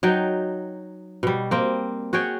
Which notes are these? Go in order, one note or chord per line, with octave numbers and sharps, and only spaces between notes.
F#3 D#4 G5
B2 G3
A#3 C4
F#4 G#4 C#5 G5